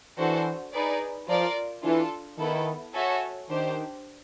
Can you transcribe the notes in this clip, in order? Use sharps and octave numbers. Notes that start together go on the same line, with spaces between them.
E3 D4 F#4 A4 C5
D#4 G#4 B4 D5
F3 F4 A#4 D5
E3 D4 F4 A4
D#3 B3 E4 A4
F#4 A4 C#5 E5 G#5
D#3 D4 G4 C5